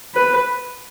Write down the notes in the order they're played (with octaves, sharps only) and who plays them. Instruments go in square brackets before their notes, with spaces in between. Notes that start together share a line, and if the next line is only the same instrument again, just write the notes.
[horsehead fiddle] B4